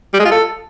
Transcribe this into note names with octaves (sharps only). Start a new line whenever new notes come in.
G3
G#3
F4
A4